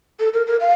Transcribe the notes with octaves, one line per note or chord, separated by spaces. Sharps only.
A4
A#4
A#4
F5